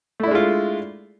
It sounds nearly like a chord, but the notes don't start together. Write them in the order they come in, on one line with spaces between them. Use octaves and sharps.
A3 E4 D4 G#3 F4